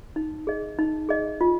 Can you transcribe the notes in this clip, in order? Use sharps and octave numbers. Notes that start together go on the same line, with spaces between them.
D#4
G#4 D#5
D#4
G#4 D#5
F4